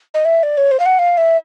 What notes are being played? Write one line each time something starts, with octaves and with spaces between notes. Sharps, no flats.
D#5
E5
D5
C#5
C5
F5
F#5
F5
E5